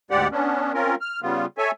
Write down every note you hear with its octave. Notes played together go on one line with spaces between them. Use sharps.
D2 G#2 G#3 G4 D5 F#5
B3 C#4 D4
C4 C#4 F4 A#4
F6
C#3 G3 B3 F4
A4 C#5 E5 G#5